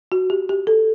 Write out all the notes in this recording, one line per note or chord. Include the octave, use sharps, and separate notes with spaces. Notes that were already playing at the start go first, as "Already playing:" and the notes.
F#4
G4
G4
A4